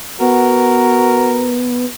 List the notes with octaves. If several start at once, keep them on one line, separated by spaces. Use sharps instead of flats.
B3 F#4 A#4